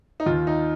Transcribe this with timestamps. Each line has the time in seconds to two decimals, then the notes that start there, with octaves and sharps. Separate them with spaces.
0.20 D#4
0.26 D#2 D#3 F4
0.47 D#4